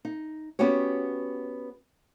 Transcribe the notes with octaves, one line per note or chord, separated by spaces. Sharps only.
D#4
B3 C#4 F#4 G4 C#5